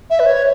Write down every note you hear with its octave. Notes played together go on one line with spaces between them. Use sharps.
E5
B4
C#5